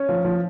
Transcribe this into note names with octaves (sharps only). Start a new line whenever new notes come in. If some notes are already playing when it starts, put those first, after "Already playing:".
Already playing: C#4
F3
F3